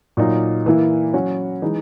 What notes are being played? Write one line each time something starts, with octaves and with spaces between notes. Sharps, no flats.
A#2 F#3 A#3 D#4
E3 A#3 E4
F#3 C#4 F#4
E3 G#3 D#4